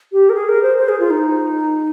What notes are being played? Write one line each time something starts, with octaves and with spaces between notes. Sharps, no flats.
G4
A#4
G#4
A#4
C5
C5
G#4
F4
D#4